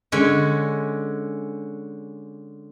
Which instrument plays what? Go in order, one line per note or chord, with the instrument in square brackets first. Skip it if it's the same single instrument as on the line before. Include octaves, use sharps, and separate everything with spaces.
[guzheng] D3 G#3 C#4